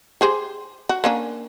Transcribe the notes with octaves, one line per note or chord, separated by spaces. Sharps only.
G4 G#4 C5
F#4
A#3 C#4 D4